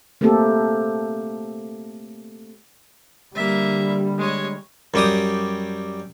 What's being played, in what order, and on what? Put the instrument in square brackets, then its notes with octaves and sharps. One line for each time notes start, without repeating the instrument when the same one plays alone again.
[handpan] A3 A#3 C4 G4 A4
[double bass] D3 G3 [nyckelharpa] A#3 E5
[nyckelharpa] G#3 C#5
[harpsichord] F#2 G3 G4 D#6